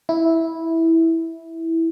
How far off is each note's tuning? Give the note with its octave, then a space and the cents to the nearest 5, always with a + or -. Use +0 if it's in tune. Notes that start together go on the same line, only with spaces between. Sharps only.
E4 -10